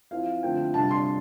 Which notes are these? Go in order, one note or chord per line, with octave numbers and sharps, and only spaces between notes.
F3 C4 E4 F5
D3 F3 A3 C4 F4 G5
C3 G3 D4 F4 A5
C6